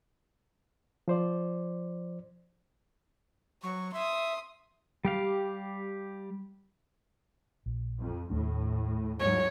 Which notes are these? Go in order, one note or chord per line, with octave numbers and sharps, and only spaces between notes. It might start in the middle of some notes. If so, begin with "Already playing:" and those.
F3 C5 D5
F#3 C#6
E5 C6 D#6
G3 G4 F5
A#1
F2
D#2 A2 A3 D4
G#2 F#3 C#5